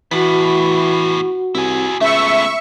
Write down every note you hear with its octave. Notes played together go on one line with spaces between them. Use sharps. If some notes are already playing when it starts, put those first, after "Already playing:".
A2 E3 B3 F#4 F#5
C2 E4 G#4
C#2 A3 B3 E5 C#6